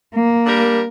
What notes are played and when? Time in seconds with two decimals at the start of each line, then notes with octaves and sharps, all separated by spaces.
0.15 A#3
0.47 G3 D4 A#4